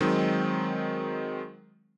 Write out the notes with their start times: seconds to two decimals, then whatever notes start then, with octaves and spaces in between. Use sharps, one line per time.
0.01 D#3 F#3 G#3 C4 D#4